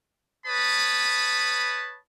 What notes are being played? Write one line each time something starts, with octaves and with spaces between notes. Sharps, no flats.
B4 C#5 A5 B5 D#6